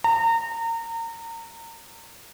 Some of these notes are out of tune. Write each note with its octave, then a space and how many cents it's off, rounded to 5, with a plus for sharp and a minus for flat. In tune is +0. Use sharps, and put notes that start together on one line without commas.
A#5 -30